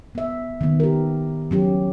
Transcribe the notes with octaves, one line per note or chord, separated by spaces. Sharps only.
B3 E5
D#3 B3
G4 A#4
F#3 C#4 G4